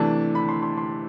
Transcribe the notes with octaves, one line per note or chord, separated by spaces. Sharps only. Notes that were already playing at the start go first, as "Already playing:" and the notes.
Already playing: C3 E3 A3 D4 A5
B5
C6
C6
C6